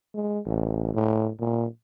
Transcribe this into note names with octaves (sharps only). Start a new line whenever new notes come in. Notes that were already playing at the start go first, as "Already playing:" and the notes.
G#3
A1
A2
A#2